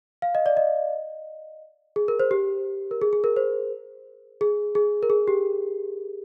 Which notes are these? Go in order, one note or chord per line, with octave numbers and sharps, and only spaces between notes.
F5
D#5
D5
D#5
G#4
A#4
C5
G4
A#4
G#4
G#4
A#4
C5
G#4
G#4
A#4
G#4
G4